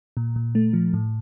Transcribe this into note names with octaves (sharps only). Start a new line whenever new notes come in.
A#2
A#2
A3
F3
A2